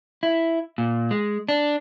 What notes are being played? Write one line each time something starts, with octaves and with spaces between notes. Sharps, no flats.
E4
A#2
G#3
D4